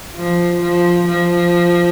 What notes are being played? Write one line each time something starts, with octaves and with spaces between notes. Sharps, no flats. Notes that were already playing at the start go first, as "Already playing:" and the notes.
F3
F3
F3